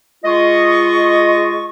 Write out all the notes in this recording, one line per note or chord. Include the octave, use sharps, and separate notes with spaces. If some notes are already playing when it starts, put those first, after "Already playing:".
G#3 F4 D#5 C#6